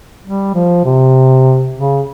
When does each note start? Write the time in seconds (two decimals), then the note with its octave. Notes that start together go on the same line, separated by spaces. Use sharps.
0.24 G3
0.54 F3
0.85 C3
1.75 C#3